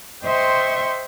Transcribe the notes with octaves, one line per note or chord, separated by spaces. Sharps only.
C5 D#5 E5 G5 C6 C#6